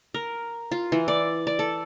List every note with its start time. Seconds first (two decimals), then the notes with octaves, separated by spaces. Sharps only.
0.14 A#4
0.71 F4
0.92 E3
1.08 D5
1.47 D5
1.59 A4